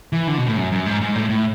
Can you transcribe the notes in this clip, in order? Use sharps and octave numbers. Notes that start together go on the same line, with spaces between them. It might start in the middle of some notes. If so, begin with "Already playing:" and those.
E3
D3
B2
A2
F#2
F#2
G#2
G#2
A2
A2